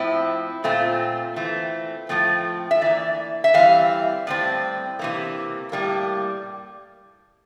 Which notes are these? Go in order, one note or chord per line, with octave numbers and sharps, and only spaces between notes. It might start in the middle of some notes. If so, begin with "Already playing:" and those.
Already playing: A2 F3 C4 E4
A#2 A3 C4 F4
E3 A3 C4
A2 F3 A3 C4
E5
E3 A#3 D5
E5
E3 G3 C4 F5
A2 G3 C4
C3 E3 A#3
A2 G3 A#3